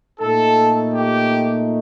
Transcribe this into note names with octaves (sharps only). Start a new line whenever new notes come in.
A#2 A3 D#4 A4
G4